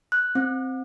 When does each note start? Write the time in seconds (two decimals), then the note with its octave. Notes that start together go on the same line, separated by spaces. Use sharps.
0.12 F#6
0.35 C4